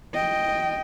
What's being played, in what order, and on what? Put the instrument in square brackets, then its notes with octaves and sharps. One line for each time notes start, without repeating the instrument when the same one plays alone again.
[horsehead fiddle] D#5 G5